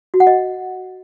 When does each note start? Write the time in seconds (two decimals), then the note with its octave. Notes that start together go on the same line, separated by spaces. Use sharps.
0.14 F#4
0.20 F#5
0.27 D#5